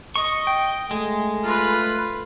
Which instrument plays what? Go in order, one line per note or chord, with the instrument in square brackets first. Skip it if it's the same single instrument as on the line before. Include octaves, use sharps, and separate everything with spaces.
[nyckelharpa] D#5 [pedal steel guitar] C#6
[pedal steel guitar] G5
[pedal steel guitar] G#3 [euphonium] A3
[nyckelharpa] F4 B4